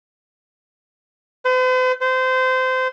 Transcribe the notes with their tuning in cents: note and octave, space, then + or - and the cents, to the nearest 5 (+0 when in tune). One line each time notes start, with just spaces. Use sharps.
C5 -45
C5 -25